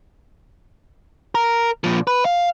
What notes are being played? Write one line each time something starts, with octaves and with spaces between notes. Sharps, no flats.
A#4
A#2 F3
B4
F5